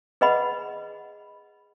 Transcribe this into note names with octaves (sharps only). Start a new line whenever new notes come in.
G#4 B4 D#5 F#5 B5